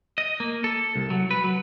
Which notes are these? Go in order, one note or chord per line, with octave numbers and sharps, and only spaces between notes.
D#5
A#3
A4
C2
F#3
B4
F#3